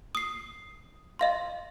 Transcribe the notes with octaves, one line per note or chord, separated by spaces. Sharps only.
D#6 C7
D#5 F5 C6